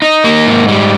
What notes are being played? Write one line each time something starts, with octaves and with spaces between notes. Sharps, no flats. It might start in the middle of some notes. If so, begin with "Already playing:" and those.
D#4
A#3
G#2
G3